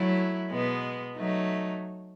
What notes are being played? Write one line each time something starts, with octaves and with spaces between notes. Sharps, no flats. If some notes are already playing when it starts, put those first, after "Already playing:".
Already playing: F#3 A3 E4
B2 G#3 B3
F#3 A3 D#4